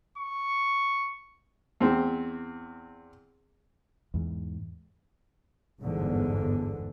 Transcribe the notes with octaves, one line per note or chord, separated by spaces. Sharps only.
C#6
E2 C4
E2 G#2
G1 E2 G#2 D3